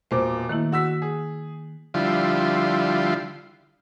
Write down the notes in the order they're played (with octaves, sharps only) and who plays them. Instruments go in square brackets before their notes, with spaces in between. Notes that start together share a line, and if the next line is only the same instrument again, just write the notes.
[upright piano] E1 A#2 D6 [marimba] C5
[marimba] D#3 A#3 E4 [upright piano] A3
[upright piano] F#4 E6 B6
G#4
[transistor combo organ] D3 F3 G3 E4 F4 C6